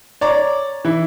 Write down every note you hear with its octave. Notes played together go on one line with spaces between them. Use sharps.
C#5 D5 A#5
E3 E4